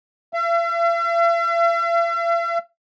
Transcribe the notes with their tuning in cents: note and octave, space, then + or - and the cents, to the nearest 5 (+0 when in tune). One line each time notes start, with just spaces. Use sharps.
E5 +45